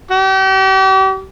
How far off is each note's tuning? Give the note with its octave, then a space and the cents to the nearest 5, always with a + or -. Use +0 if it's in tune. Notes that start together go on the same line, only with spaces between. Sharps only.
G4 -40